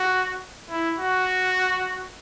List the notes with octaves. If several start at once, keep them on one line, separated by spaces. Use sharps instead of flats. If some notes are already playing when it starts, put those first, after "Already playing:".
Already playing: F#4
E4
F#4